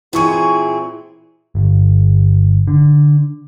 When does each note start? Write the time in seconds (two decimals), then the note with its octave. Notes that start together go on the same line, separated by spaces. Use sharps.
0.13 A#2 E3 C4 E4 G#4 C#6 D#7
1.55 G1
2.67 D3